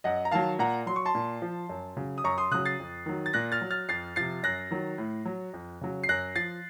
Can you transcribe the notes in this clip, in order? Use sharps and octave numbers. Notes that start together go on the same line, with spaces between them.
F#2 D#5 F#5
A#5
D#3 F#3 F5 A5
A#2 F#5 A#5
F#3 C6
C#6
A5 C6
A#2
F3
F#2
C#3 F#3
D#6
F#2 A#5 C#6
C6 D#6
C#3 F#3 D#6 F#6
A6 C7
F2
D#3 F#3
A6
A#2 F#6 A#6
F6 A6
F#3
F6 A6
F2 A6 C7
C3 F3 A6 C7
F#2 F#6 A#6
D#3 F#3
A2
F#3
F2
C#3 F#3
C7
F#2 F#6 A#6
F3 A6 C7